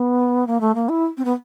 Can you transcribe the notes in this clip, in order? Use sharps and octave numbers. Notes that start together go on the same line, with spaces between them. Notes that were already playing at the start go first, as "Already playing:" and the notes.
Already playing: B3
A#3
A3
A#3
E4
C4
B3